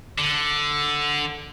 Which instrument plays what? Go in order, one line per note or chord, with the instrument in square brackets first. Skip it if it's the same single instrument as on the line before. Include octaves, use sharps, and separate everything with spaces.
[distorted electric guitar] D3